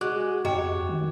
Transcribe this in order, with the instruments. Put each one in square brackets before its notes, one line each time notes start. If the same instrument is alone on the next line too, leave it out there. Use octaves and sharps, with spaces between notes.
[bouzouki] G#3 [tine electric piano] F#4 D6 F#6
[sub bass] F2 [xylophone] G4 D#5 G5 [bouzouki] C#5
[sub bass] D#3